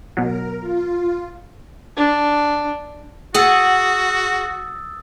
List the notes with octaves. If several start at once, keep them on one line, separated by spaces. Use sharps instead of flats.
B2 F#3 A#4
F4
D4
F#4 G#4 F#5 D#6 E6 A6